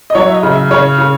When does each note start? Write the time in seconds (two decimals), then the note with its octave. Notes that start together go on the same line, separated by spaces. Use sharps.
0.10 D#5
0.15 F#3 C#5
0.28 E5
0.34 D#5
0.43 C#3
0.52 E5
0.71 C#3 C#5
0.98 C#3